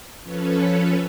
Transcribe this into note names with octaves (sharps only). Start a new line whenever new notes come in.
F3 C#4 A4 B4 C#5